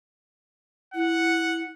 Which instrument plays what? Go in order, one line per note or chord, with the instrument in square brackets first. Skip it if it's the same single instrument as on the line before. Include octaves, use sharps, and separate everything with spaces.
[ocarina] E4 [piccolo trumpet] F#5